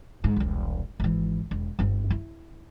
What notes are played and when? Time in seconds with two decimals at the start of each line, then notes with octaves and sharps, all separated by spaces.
0.24 G#2
0.36 E1 C2
1.00 G#1 E3
1.51 E1
1.79 G1 C4
2.10 E4